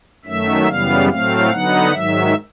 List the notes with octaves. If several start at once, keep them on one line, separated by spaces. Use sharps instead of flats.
F#2 D#3 F#3 A3 E5
F#2 C#3 E3 G3 B3 F5
A2 F#3 A3 C4 F5
D3 F#3 B3 D#4 F#5
G#2 D#3 F#3 E5